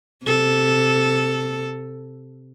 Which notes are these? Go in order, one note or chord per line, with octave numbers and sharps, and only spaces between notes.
C3 A4